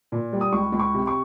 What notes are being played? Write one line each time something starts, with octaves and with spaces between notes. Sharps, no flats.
A#2
G3
D#6
C#2 C#6
C#2
C#6
C3
C#6